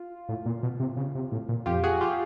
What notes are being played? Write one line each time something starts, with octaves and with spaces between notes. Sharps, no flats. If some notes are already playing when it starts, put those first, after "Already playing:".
Already playing: F4
A2
A#2
B2
C3
C#3
C3
A2
A#2
F2 F4 G4
F#4 G#4
F4 G4